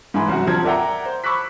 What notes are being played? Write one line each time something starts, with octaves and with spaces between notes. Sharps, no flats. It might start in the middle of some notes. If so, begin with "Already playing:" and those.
G#2 E3 G#5 B5
C2 F#2 F#4
D#1 G2 F3 C4 G#6
A#4 D5 E5 F#5 G5 A#5
C5
B5 C#6 D6 E6 F#6 B6